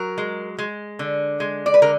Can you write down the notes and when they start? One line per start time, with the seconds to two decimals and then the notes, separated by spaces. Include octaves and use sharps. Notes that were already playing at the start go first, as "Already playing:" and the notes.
Already playing: F#3 A#4
0.18 G#3
0.58 G#3
0.99 D3
1.40 G#3
1.66 D5
1.74 B4
1.82 D3 A#4